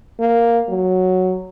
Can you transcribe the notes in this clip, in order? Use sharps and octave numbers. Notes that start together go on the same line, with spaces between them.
A#3
F#3